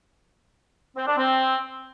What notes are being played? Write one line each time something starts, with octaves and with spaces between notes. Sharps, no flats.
C4
D4
C4